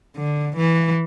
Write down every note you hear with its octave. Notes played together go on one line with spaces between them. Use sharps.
D3
E3